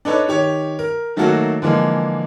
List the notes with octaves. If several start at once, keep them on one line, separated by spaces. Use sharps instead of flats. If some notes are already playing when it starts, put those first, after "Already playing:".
D4 D#4 A4 B4 C#5
D#3 G4 C#5
A#4
D#3 F#3 A3 A#3 F#4 A4
D3 E3 F3 G#3 A#3